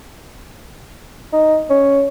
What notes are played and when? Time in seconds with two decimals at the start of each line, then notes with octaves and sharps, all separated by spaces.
1.32 D#4
1.70 C#4